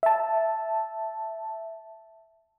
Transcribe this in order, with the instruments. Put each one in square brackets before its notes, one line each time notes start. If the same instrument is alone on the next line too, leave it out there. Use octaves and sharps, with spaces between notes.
[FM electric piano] E5 A5